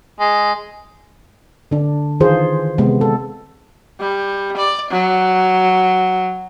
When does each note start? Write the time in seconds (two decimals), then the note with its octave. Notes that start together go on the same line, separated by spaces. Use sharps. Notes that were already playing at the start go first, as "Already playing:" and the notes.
0.20 G#3
1.71 D3 D4
2.20 D#3 E3 F4 G#4 C5
2.78 C3 G#3 B3
3.01 A4
4.00 G3
4.57 D5
4.90 F#3